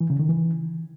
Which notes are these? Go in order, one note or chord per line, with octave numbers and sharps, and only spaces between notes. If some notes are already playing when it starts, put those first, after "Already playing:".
E3
C#3
D#3
E3